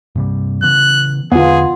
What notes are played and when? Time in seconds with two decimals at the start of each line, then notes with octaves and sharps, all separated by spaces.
0.15 G2 C3 G3
0.62 C#3 E3 B3 F#6
1.32 E2 D3 B3 F4 G#4